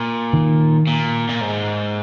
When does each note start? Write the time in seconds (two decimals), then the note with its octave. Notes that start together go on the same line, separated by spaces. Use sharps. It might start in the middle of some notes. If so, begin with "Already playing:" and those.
Already playing: A#2
0.33 D#3
0.87 A#2
1.29 A#2
1.41 G#2